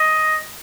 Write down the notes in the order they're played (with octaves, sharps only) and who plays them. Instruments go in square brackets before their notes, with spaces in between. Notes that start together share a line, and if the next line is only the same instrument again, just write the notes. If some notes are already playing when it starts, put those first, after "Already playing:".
Already playing: [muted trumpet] D#5